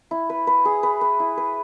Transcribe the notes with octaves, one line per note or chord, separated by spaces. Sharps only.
E4
B4
B4
G#4
B4
B4
E4
B4